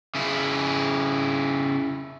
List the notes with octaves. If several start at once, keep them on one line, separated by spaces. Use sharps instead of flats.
C#3 E4